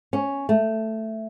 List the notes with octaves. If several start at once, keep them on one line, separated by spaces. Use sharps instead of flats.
C#4
A3